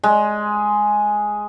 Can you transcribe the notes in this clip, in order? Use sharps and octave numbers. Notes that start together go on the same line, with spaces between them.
G#3